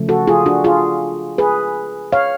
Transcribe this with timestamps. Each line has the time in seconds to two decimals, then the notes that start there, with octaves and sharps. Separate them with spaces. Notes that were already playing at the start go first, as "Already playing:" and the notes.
Already playing: C#3 F3 A3
0.09 F#4 A4
0.28 F4 G#4
0.46 D4 F#4
0.64 F4 G#4
1.38 G#4 B4
2.12 C#5 F5